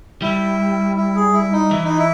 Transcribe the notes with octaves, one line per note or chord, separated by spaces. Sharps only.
G3 E4
E4
G#4
E4
D#4
E3 E4
D#4
E4